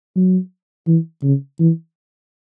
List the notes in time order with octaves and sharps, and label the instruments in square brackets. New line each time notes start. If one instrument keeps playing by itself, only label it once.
[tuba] F#3
E3
C#3
E3